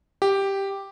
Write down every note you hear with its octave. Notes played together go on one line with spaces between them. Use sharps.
G4